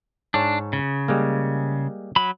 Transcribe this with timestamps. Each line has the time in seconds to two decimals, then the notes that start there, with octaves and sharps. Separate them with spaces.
0.34 G#2 D4 C#5 A5
0.73 C#3
1.08 G3 G#3 A#3
2.16 F#3 B5